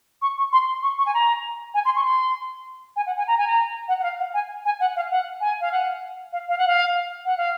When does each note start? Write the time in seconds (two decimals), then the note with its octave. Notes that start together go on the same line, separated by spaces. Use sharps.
0.22 C#6
0.37 C#6
0.52 C6
0.83 C#6
0.98 C#6
1.06 G#5
1.14 A#5
1.74 G#5
1.85 C6
1.96 C#6
2.05 C6
2.96 G#5
3.06 F#5
3.18 G#5
3.28 A#5
3.38 G#5
3.47 A#5
3.88 F#5
3.99 F#5
4.03 F5
4.19 F#5
4.34 G#5
4.65 G#5
4.80 F#5
4.96 F5
5.11 F#5
5.41 G#5
5.61 F5
5.72 F#5
6.33 F5
6.48 F5
6.58 F#5
6.67 F5
7.25 F#5
7.37 F5